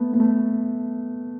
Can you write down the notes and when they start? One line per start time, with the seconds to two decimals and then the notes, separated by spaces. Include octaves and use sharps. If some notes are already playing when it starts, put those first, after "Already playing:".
Already playing: A3 B3
0.13 B3
0.20 A3